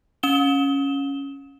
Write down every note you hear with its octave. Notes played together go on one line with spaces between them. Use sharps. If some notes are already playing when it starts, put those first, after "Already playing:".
C#4 E7 G7